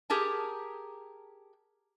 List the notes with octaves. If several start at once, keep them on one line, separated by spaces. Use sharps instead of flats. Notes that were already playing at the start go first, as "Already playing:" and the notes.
G4 G#4 A#4 A5